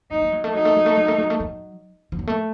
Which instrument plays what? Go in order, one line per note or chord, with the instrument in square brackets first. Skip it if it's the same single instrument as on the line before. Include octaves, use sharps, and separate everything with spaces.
[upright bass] F#3 [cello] D#4
[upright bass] A3
F#3
A3
[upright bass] F#3 [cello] D#4
[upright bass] A3
F#3
A3
F#3
A3
F#3
A3
F#3
F3
F#3
A3